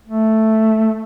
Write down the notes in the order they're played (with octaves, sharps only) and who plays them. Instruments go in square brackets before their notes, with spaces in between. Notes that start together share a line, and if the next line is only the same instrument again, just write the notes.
[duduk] A3